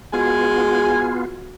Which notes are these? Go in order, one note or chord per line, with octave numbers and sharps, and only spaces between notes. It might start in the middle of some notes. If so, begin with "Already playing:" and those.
G#3 B3 F4 F#4 G#5